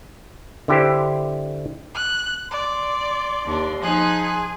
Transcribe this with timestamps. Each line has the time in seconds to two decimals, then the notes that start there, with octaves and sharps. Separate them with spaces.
0.68 D3 E4 G4 C5
1.95 F#6
2.51 D5 C6
3.46 D#2 D4
3.82 F3 D#4 G#4 F#6